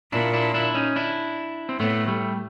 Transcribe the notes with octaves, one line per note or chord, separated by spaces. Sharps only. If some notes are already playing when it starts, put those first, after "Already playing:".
A#2 D4 E4
D4 E4
D4 E4
C#4 D#4
D4 E4
C4
A2 A3 B3
G3 A3